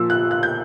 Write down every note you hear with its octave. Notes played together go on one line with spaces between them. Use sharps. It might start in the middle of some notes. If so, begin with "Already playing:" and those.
Already playing: A#2 F3 E6
F#6
F#6
G6